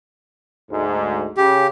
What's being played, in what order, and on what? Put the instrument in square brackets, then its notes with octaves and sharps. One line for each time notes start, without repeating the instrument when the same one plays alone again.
[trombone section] D2 G#2
[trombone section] C#3 [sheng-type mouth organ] G4